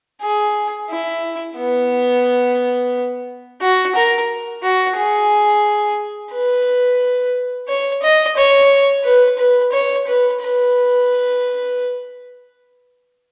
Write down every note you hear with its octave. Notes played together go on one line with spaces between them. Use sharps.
G#4
E4
B3
F#4
A#4
F#4
G#4
B4
C#5
D#5
C#5
B4
B4
C#5
B4
B4